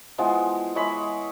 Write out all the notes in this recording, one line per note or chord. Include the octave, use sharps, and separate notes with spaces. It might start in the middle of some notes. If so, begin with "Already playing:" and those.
E3 F3 G#3 B3
G#3 C#5 E5 B5